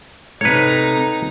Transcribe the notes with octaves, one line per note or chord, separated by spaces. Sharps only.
C3 A3 D#4 B4 C#5 A#5